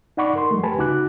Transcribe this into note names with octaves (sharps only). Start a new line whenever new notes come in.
D#4 D5 F#5 B5 C#6 D6
A#4 C6
F3 G3 A3
G4 B4 G#5 A5 B5
C#2 C#3 D#4 F#4 D6 F#6